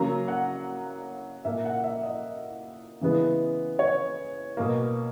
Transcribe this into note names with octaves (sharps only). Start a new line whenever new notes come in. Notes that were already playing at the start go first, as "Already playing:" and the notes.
Already playing: C#3 F#3 A#3 A#5
F#5
A#2 A#3 E5
F#5
E5
D#5
C#3 E3 G#3 B3
C#5
B2 A#3